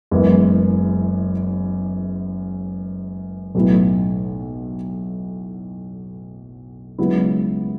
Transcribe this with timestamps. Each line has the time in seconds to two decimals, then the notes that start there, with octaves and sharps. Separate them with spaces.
0.11 F#1 F#2 E3 G#3 B3
3.55 B1 A2 F#3 B3 E4
6.98 C#2 C#3 F#3 B3 E4